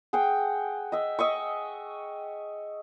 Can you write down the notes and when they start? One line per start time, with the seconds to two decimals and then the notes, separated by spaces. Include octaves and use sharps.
0.13 G#4 F#5 G5
0.92 D#5 E5
1.19 D#5 E5 C#6